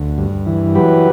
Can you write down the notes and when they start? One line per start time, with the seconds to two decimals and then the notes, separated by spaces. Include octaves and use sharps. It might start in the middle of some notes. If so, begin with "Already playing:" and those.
Already playing: D2
0.18 G2
0.46 E3
0.75 F#3 G4 B4